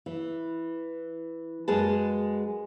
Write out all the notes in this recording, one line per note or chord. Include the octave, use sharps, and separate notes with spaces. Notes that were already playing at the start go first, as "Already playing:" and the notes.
E3
F#2 G#3 G#4 B4 A5